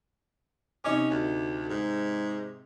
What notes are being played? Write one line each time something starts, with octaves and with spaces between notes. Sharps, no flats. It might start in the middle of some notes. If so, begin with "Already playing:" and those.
C3 C#4 D#4 D6
D2
G#2